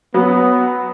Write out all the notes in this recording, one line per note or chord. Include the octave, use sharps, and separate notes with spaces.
F#3 B3